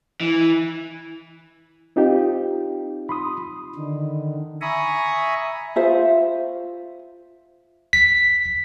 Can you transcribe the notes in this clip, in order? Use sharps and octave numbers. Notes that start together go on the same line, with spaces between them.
E3
C4 D#4 F4 G4
B5 C6 D#6
D3 D#3
E5 G#5 A#5 B5 C#6 D#6
F4 C5 E5
B6